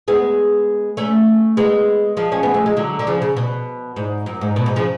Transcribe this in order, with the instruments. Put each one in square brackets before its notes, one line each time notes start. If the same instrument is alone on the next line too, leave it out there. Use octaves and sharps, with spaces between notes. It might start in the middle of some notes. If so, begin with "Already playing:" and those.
[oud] G#3 B3
A3 C#4
G#3 B3
F3 G#3
C#4
B3
A3
G#3
D3 F#3
D3
C#3 F3
C#3
B2
G#2
F#2
G#2
B2
G#2
C#3 F3